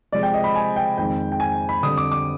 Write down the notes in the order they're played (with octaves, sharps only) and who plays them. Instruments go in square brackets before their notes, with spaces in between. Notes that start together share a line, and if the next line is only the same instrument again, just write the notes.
[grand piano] C3 F3 G#3 D5
G5
D#5
B5
G#5
G5
F2 D#3 G#3 G5
G5
G#5
B5
F2 D3 G3 D#6
D6
D6